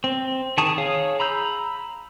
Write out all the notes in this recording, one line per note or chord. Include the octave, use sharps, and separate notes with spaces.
C4
D#3 G#4 A5 C#6 D#6
G#4 C#5 F5 D#6
A#5 B5 E6 G6